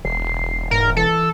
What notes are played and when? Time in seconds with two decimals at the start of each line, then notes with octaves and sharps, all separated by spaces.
0.05 E1 C7
0.71 G#2 A#4
0.97 E3 A4